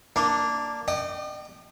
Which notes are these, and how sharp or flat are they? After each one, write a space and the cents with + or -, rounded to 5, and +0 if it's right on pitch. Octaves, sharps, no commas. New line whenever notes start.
A#3 +0 D4 +0
D#5 -45 G5 -25